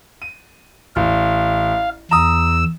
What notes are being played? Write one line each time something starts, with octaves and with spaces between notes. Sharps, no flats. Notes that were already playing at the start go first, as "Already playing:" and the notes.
D#7
A1 F5
E2 A#5 D#6 E6